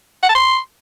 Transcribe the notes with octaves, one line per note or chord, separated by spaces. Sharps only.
F#5
A5
C6